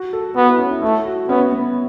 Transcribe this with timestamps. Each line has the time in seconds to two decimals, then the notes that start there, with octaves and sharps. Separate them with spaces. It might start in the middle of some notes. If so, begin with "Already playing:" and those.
Already playing: F#4
0.13 A4
0.36 B3 F#4
0.48 E4
0.59 C#4
0.71 E4
0.82 A3 E4
1.05 F#4
1.29 B3 C#4
1.52 B3